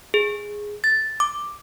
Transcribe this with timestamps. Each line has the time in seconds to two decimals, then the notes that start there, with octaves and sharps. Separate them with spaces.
0.14 G#4
0.84 A6
1.20 D6